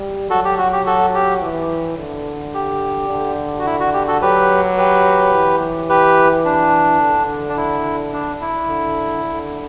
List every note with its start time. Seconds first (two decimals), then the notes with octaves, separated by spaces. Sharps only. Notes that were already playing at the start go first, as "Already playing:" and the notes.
Already playing: G3
0.30 F#3 F#4 A4
0.45 G4
0.58 F#4
0.72 G4
0.87 F#4 A4
1.15 G4
1.42 E3
1.98 D3
2.54 G4
3.10 D3
3.59 F#4
3.66 E4
3.80 F#4
3.93 G4
4.08 F#4 A4
4.22 F#3 G4 B4
4.78 G4 B4
5.33 E3
5.89 G4 B4
6.45 D4
7.01 D3
7.49 D4
7.57 E4
8.13 D4
8.41 E4
8.69 D3
9.24 D3